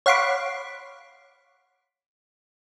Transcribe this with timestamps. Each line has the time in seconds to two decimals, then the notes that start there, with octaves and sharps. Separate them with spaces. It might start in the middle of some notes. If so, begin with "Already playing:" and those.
0.06 C#5 F5 F#5 B5 C6 D6